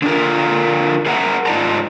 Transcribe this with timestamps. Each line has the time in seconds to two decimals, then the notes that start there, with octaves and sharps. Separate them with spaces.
0.02 D3 D4 F4 A#4
1.06 G#4 A#4 E5 F#5 A#5
1.46 G#2 D#4 F4 D5 A5 A#5